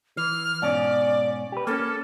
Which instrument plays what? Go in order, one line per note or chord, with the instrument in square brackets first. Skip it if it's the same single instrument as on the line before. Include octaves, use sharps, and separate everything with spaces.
[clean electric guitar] E3 [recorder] F6
[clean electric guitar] G#2 B2 C#4 [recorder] D5
[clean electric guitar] G4 B4
[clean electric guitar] A#3 C#4 [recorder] A4